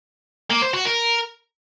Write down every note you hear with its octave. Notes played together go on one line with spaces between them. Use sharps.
A#3
C5
F#4
A#4